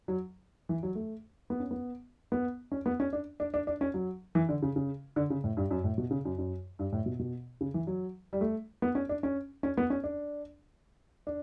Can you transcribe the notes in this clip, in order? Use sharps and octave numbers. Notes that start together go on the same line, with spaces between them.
F#3
E3
F#3
A3
B3
C#4
B3
B3
C#4
B3
C#4
D4
D4
D4
D4
C#4
F#3
E3
D3
C#3
C#3
D3
C#3
A2
G2
F#2
A2
B2
C#3
F#2
F#2
G2
A2
B2
B2
C#3
E3
F#3
G3
A3
B3
C#4
D4
C#4
C#4
B3
C#4
D4
D4